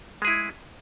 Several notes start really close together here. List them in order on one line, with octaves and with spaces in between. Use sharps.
G#3 G#4 E4